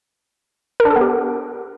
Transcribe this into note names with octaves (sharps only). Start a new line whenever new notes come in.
A#4
D4
A4
B3
G4